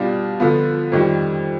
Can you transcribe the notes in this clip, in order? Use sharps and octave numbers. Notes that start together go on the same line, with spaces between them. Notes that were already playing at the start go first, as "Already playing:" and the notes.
Already playing: B2 G3 D4 F4
D3 F3 B3 F4
F2 D#3 G3